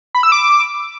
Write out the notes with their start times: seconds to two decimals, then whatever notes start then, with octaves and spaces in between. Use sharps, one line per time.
0.15 B5
0.23 E6
0.32 D6